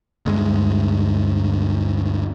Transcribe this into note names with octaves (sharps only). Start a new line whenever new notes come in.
D2 G2 G#3